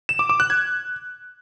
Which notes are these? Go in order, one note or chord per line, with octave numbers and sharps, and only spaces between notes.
E7
D6
D6
F#6
G#6